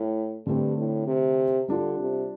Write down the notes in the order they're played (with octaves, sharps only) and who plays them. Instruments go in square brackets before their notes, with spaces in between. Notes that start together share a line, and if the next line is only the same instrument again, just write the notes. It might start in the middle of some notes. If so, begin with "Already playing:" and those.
Already playing: [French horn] A2
[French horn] G2 [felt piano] D3 A3 C4
[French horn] A2
C3
[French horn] D3 [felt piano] G3 D4 F4
[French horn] C3